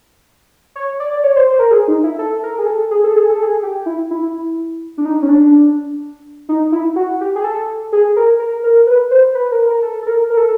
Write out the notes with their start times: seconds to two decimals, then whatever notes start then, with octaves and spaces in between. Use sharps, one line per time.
0.75 C#5
1.00 D5
1.13 D5
1.24 C#5
1.36 C5
1.47 C5
1.59 A#4
1.71 G#4
1.88 D#4
2.04 E4
2.19 A4
2.43 A#4
2.58 G#4
2.66 A4
2.91 G#4
3.04 A4
3.16 G#4
3.30 A4
3.43 G#4
3.63 G4
3.86 E4
4.11 E4
4.98 D4
5.05 D#4
5.22 C#4
5.29 D4
6.49 D#4
6.72 E4
6.96 F#4
7.21 G4
7.36 G#4
7.44 A4
7.93 G#4
8.16 A#4
8.39 A#4
8.64 A#4
8.87 B4
9.11 C5
9.35 B4
9.51 A#4
9.68 A#4
9.82 A4
10.02 A4
10.07 A#4
10.30 A#4
10.37 A4